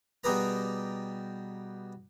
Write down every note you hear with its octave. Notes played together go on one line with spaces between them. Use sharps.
B2 G3 G4 G#4 B4 A#5